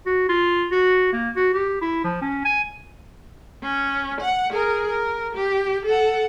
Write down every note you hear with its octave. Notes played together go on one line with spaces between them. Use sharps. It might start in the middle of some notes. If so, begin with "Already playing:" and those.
F#4
F4
F#4
A#3
F#4
G4
E4
F3
C#4
G#5
C#4
F#5
G#4 A#4
A#4
G4
A4 F#5